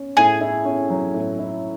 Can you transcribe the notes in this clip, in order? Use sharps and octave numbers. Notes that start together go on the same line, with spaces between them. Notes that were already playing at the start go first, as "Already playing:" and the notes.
Already playing: C#4
A2 G#4
E4
C#4
F#3
A2
E4